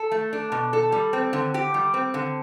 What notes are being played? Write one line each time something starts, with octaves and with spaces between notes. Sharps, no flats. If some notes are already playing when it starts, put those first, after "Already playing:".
Already playing: A4
A3
D4
B2
A4
G3
C4
D3
G4
G3
C4
D3